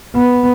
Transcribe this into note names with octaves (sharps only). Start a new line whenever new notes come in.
B3